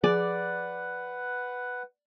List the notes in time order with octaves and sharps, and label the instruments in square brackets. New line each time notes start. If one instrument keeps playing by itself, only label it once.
[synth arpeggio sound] F3 G#4 D6 [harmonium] B4 F#5 [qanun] D5